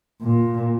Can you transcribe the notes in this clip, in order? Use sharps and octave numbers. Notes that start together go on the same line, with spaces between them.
A#2